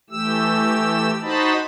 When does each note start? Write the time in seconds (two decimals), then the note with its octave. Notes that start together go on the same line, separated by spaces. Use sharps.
0.10 E3 A3 G4 E6
1.22 D#4 F#4 C5 D#5 A5 B5